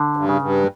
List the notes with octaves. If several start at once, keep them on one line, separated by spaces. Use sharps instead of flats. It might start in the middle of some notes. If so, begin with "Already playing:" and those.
Already playing: D3
G2
C#3
G2